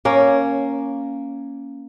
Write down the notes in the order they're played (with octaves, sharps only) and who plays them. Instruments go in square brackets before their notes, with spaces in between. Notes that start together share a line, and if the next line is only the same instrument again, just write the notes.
[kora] A#3 C#4